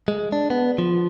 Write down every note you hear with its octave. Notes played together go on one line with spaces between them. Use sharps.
G#3
D4
B3
F3